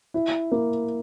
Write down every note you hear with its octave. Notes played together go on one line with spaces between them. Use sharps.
E4
A#3